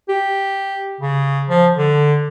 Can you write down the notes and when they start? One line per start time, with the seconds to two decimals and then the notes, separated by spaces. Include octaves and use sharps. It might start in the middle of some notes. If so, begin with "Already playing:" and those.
0.09 G4
1.01 C#3
1.49 F3
1.76 D3